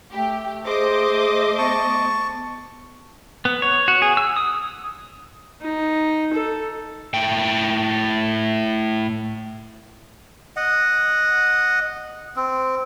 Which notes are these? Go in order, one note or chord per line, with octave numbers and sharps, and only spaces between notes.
A3 G4
G#4 C5 D#5 D6
B3 A5 C#6
B3
C#5
F#4
G#4
E6
D#6
D#4
A4
A2 G5
D#5 F#5
C4